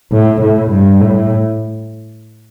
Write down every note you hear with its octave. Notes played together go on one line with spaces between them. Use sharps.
A2
A2
G2
A2